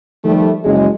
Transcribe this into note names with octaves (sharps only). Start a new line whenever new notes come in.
D#3 F3 G3 A3
F#1 G#3